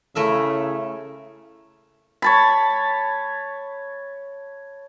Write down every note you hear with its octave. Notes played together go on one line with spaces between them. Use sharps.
C#3 A3 E4 A#4 E5
C#5 A5 B5